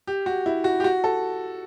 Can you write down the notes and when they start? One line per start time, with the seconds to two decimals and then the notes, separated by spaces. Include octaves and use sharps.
0.07 G4
0.26 F#4
0.46 E4
0.64 F#4
0.80 G4
0.84 F#4
1.04 A4